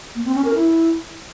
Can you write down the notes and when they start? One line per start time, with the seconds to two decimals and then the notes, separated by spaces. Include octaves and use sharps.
0.15 A#3
0.25 C4
0.35 C#4
0.45 A#4
0.55 E4